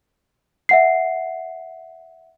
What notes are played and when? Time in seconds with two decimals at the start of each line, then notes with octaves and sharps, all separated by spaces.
0.69 E5 F#5 C7